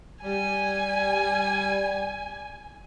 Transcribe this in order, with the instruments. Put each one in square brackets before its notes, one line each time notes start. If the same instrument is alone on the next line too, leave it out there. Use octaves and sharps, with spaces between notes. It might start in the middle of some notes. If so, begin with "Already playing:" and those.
[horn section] G3 [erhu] G#5